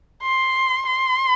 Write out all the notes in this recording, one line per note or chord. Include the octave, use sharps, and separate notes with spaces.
C6
C6